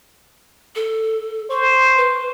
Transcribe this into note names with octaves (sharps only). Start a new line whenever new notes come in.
A4
C5 C#6
B4